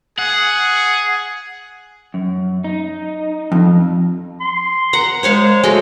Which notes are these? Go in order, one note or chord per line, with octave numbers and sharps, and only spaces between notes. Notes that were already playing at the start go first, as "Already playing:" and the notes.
G#4 F#5
F#2
D#4
F2
C6
F#5 A#5
G#3 C5 C#5 F5
G#3 A3 F#4